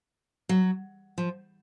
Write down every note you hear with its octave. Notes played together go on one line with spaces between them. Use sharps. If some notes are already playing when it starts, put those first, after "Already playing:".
F#3
F3